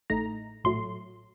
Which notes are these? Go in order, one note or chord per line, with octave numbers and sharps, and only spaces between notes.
A1 A2 A3 D#4 A#5
A#1 A2 F#3 A3 C6